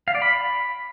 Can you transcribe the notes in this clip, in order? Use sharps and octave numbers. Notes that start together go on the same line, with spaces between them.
F5
D5
B5